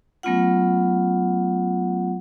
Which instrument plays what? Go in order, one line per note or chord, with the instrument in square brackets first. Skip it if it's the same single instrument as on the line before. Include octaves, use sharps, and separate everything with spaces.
[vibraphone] F#3 A3 B3 C#4 F4 F#5